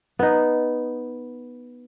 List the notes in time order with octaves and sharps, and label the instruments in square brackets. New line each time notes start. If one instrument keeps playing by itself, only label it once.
[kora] B3 D#4